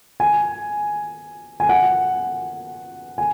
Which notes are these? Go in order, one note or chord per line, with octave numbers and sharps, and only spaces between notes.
G#5
G#5
F#5
G#5